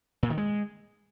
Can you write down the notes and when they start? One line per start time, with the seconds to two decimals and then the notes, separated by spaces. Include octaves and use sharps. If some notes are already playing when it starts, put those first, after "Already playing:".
0.23 A#2
0.30 D#3
0.38 G#3